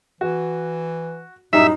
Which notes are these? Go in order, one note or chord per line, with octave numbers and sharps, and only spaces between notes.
E3 F#4
F#2 A2 G3 D#4 E5 E7